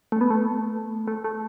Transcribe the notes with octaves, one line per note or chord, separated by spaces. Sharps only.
A3
B3
A3
A3
A3